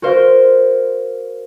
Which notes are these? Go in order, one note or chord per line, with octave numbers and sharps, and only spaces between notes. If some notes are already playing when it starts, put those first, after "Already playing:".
F#4 A#4 C5 F5